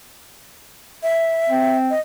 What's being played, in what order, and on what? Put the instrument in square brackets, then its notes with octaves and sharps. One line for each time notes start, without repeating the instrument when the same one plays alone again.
[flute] E5
[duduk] C4
[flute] D#5